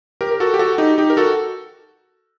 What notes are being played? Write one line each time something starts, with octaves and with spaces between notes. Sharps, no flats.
G4 A#4
A#4
F#4 A4
G4
F#4 A4
D#4 G4
D#4 G4
A#4
F#4 A4